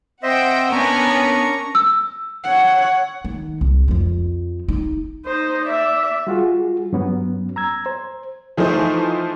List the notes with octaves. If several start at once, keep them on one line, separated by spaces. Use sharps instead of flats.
C4 C5 D#5 E5 F#5 G5
B3 C#4 D4 A#4 G#5 A#5 C#6
E6
C#5 F#5
D#3
C2
F2 F3
D#4
D#4 C5
D5 E5
G3 F4 F#4 G#4
G2 F#3 B3 C#4
A#5 E6 G#6
C5
E3 F3 A3 D#4 C5